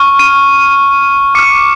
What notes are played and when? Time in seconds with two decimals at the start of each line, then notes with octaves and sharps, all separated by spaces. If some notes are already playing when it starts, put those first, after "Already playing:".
Already playing: C#6 F6
0.19 D#7
1.35 D6 F6 C#7